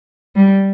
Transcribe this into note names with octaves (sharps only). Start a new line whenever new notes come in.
G3